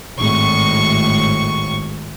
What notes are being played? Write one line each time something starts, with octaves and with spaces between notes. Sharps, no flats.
G#1 A2 C#6